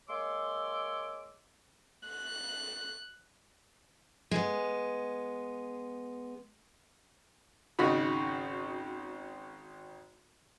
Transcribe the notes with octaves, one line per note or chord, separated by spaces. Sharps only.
G#3 A#3 C#5 C6 D6 E6
F#6
G#3 B3
G#1 C#3 D#4 F#4 B5